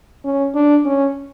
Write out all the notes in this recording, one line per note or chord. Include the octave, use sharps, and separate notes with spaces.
C#4
D4
C#4